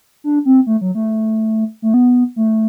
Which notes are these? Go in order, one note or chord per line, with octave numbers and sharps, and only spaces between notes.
D4
C4
A3
F#3
A3
A3
B3
A3